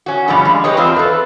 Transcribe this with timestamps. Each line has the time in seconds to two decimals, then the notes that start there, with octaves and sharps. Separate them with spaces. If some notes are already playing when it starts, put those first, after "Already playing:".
0.06 C#4 F#4
0.28 G2 B2 D3 F3 G3 C#4
0.45 G#3
0.64 G4 B4 C#5 D#5
0.77 E2 C4 F4 C5
0.96 A4 B4